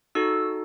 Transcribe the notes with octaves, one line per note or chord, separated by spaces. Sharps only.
D#4 F#4 A4 E6